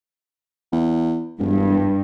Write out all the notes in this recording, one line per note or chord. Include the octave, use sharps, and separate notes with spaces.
E2
E1 G2